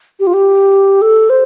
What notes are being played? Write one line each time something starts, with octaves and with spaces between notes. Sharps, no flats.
G4
F4
G4
A4
C5